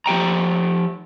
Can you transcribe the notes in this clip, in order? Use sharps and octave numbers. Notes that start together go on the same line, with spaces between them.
F3 G4 G5 A#5